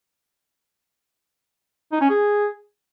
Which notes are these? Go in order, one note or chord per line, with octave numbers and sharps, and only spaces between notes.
D#4
C#4
G#4